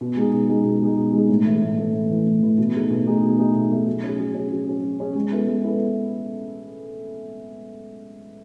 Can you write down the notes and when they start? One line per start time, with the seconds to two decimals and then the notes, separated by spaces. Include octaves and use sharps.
0.01 B2
0.16 G#3 D#4 G#4
0.33 B2
0.49 G#3 D#4 G#4
0.64 B2
0.82 G#3 D#4 G#4
0.97 B2
1.13 G#3 D#4 G#4
1.29 A2
1.45 E3 A3 E4
1.62 A2
1.78 E3 A3 E4
1.94 A2
2.10 E3 A3 E4
2.27 A2
2.42 E3 A3 E4
2.58 B2
2.74 A3 D#4 G#4
2.91 B2
3.06 A3 D#4 G#4
3.23 B2
3.39 A3 D#4 G#4
3.55 B2
3.71 A3 D#4 G#4
3.86 F#3
4.03 C#4 G#4
4.18 F#3
4.34 C#4 G#4
4.51 F#3
4.67 C#4 G#4
4.84 F#3
5.00 C#4 G#4
5.15 G#3
5.32 B3 E4 A4
5.47 G#3
5.64 B3 E4 A4